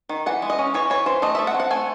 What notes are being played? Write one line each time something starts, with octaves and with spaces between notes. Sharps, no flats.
D#3
E3 F#5
G#3
D#5
C#4
E3 C#5
E3 C#5
E3 C5
A3 D#5
E5
A3
F#5
C4
F#5
A3 G#5